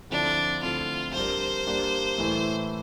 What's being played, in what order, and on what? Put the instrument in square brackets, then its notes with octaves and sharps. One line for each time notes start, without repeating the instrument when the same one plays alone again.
[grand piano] D3 F3 C4 E4 A4 [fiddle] D4
[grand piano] D3 A3 C4 E4 [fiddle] F4
[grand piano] G3 D4 G4 A#4 [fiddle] C5
[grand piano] G3 A#3 D4 G4
A2 E3 A3 E4